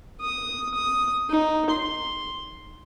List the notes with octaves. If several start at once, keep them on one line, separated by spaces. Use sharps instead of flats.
D#6
D#6
D#4
C6